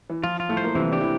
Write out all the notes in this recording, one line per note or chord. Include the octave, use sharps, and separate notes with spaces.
E3
F3 F4
F4
A2 A3
C5
A#3
C3 E3 C4
D4 G4
E3 E4